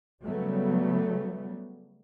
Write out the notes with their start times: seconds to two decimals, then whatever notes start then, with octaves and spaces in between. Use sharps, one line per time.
0.23 C#3 F#3 G3 A3 B3